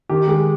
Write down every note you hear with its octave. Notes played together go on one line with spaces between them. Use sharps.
D#3 G4
G#3